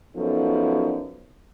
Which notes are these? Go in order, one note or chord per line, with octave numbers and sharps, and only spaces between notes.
F#2 F3 B3 D#4 A4